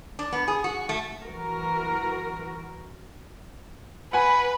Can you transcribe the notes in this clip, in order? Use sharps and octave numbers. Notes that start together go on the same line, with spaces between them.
D4
B3
G#4
F#4
A3
E3 F#4 A#4
B4 F#5 G#5 B5